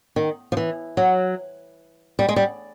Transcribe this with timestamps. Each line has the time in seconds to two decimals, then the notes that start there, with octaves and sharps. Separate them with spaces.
0.16 D#3
0.52 F3
0.57 E3
0.97 F#3
2.19 G3
2.29 G#3
2.36 G3